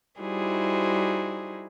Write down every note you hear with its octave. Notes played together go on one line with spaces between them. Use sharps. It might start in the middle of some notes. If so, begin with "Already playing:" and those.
G3 D#4 E4 F#4 G#4 C5